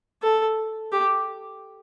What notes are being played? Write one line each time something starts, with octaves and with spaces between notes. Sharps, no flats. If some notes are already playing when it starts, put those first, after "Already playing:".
A4
G4